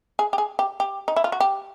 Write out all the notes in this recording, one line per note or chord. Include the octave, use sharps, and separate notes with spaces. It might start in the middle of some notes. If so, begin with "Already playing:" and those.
G#4
G4
G#4
G4
G4
D#4
E4
F4
F#4
G4